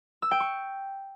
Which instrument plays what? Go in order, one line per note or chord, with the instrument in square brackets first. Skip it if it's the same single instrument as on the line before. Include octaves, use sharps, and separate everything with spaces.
[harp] E6
G5
C#6